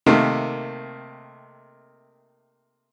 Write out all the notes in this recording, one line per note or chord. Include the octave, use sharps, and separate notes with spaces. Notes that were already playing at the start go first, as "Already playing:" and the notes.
C3 D#3 A3 A#3